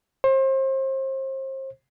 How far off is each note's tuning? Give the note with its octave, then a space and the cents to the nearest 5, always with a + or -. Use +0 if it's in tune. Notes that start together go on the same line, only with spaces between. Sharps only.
C5 +35